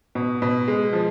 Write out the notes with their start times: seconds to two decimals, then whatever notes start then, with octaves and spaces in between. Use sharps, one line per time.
0.15 B2
0.42 B2
0.68 G#3
0.93 F3